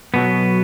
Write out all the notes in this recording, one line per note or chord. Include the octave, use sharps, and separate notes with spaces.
B1 B2 F#3 B3